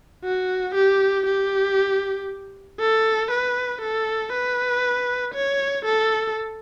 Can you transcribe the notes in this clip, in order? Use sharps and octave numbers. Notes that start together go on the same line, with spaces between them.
F#4
G4
G4
A4
B4
A4
B4
C#5
A4